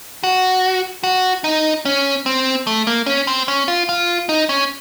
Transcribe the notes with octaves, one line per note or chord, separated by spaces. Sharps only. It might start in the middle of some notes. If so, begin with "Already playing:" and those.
F#4
F#4
D#4
C#4
C4
A3
A#3
C#4
C4
C#4
F4
F4
D#4
C#4